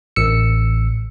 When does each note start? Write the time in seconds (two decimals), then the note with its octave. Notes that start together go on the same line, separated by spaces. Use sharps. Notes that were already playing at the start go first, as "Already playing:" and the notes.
0.16 A1 E6 C#7